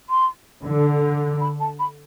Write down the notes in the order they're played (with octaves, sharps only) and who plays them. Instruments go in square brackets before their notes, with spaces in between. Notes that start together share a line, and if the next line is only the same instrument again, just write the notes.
[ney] C6
[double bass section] D3
[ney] B5
A5
B5